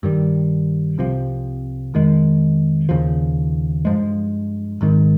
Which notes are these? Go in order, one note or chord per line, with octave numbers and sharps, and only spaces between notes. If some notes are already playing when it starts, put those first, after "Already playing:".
G2 D#3 G3
C2 C3 F3
F2 D#3 G#3
D#2 C#3 F3
G2 F3 G#3
G#1 G#2 D#3 G#3